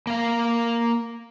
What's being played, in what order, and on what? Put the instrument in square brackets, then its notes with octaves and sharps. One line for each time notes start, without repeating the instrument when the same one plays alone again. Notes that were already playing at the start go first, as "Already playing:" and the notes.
[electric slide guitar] A#3 F5